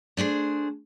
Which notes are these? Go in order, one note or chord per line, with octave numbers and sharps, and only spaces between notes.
A3 D4 G#4 C5